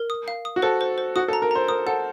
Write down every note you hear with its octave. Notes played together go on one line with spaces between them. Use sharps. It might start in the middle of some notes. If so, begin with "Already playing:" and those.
Already playing: A#4
D#6
F5
D#6
F#4
A4 C5
C5
C5
F#4 D#6
A4
A#5
A#4
C5 A#5
A#4 D#6
A4 F#5